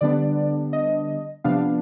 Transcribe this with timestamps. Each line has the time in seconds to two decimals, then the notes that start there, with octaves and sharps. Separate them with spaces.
0.01 D3 G3 B3 D4 D5
0.73 D#5
1.44 C3 F3 B3 D4 F5